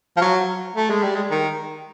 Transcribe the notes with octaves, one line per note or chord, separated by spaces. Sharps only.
F3
F#3
A3
G#3
G3
G#3
D#3